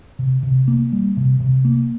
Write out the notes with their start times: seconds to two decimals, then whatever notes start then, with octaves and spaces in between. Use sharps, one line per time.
0.19 C3
0.43 C3
0.68 A#3
0.92 G3
1.17 C3
1.40 C3
1.65 A#3